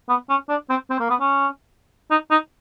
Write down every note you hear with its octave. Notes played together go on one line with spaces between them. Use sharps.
B3
C#4
D4
C4
C4
A#3
B3
C#4
D#4
D#4